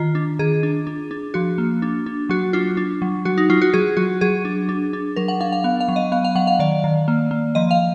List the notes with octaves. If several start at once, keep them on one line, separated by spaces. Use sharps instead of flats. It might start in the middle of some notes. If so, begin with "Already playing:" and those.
Already playing: D#3 F4
D4
D#3 G#4
D4
D4
D4
F3 F#4
A#3
D4
D4
F#3 F#4
D4 F4
D4
F#3
F#3 F#4
D#4
F#3 F4
F#4
F#3 G#4
F#3 F#4
F#3 G#4
D4
D4
D4
F#3 A#4
F#5
D4 F5
F5
B3 F5
F5
F#3
D#5
B3 F5
F5
F#3 F#5
F5
D#3 D5
D#3
A#3
A#3
F3 D#5
F5